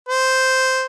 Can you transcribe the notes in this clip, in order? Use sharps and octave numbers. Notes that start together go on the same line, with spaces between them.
C5